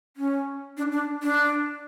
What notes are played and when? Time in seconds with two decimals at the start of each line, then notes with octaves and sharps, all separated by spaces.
0.17 C#4
0.77 D4
0.92 D4
1.23 D4